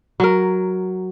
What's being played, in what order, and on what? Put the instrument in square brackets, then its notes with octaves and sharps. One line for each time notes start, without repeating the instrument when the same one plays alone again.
[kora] F#3 A#4